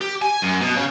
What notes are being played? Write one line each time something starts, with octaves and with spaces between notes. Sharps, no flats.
G4
G#5
F#2
B2
C#3